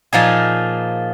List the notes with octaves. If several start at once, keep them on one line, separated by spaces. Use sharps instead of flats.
A#2 F3 D#4 G#4